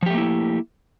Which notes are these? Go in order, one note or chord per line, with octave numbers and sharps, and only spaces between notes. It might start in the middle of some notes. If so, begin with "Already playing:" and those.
F3 A3 A#3 E4 G4